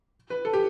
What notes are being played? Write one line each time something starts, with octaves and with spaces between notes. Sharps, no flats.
B4
A4
G4